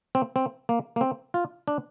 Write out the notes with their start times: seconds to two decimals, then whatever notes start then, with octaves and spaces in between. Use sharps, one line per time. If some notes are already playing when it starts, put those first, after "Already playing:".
0.15 C4
0.36 C4
0.69 A#3
0.96 A#3
1.01 C4
1.34 F4
1.68 D4